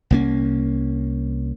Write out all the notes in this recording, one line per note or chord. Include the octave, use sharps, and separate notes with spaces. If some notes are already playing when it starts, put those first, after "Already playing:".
C2 A#3 C#4